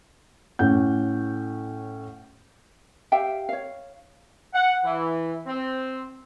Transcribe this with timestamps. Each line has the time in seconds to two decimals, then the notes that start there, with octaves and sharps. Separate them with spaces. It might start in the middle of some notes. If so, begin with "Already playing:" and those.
0.59 A2 C#4 F#5 G6
3.12 G4 E5 F5 G5
3.49 C#5 F5
4.54 F#5
4.84 E3
5.46 C4